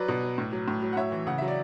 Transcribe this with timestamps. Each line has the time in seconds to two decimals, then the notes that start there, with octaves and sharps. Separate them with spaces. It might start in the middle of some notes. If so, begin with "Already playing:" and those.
Already playing: F#3 B4 D5
0.08 B2
0.23 F#3
0.38 A2
0.52 F#3
0.68 A2
0.82 F#3
0.93 F#5
0.97 A2 C#5 E5
1.12 E3
1.27 C#3 F#5
1.38 F#3 E5
1.48 D5